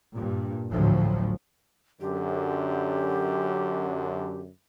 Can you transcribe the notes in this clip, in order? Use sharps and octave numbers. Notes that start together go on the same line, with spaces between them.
G2 A#2
G#1 D2 A2 F3 F#3
F#2 D3 G4